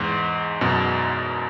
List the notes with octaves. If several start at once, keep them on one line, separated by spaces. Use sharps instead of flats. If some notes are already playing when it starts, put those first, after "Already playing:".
Already playing: E2 G#2
F#2 B2